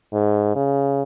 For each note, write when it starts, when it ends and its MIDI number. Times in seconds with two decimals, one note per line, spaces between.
0.14 0.52 44
0.56 1.03 49